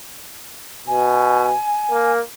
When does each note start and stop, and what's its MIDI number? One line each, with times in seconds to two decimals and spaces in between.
0.87 1.52 47
0.87 2.11 80
1.91 2.20 58